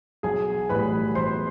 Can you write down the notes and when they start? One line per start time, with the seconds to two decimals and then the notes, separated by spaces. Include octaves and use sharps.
0.23 B1 G#4 G#5
0.69 A2 E3 G3 B4 B5
1.15 B1 C5 C6